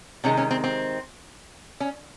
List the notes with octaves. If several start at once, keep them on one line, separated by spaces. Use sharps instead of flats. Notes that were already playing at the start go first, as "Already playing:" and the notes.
C3 D#3 G#3 C#4
C#4
C4
C4
C#4